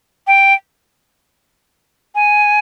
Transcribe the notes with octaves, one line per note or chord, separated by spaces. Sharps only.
G5
G#5